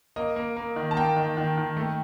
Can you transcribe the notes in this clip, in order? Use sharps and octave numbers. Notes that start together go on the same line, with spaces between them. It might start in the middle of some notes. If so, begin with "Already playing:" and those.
A#3 D#5
A#3
A#3
D#3
A5
A#3 G5
D#3
D#3
D#3
A3